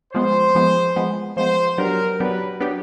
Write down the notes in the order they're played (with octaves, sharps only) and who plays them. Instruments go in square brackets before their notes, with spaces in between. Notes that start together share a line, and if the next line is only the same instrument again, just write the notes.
[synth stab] F3 G#3 B3 [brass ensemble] C5
[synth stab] F3 G#3 B3
F3 G#3 B3
[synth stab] F3 G#3 B3 [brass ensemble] C5
[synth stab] F#3 B3 D4 G4 [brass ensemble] A#4
[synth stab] F#3 B3 D4 G4 [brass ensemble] B4
[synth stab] F#3 B3 D4 G4